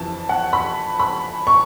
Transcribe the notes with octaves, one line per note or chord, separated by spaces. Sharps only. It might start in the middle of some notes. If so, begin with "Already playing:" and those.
Already playing: F2 C3 E3 A5
F#5
B5
B5
C#6